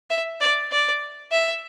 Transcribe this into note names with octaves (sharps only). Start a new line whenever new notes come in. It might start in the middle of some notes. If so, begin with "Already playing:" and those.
E5
D5
D5
E5